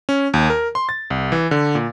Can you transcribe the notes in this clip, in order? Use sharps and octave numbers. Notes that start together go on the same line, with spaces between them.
C#4
D#2
A#4
C6
A6
C2
E3
D3
A#2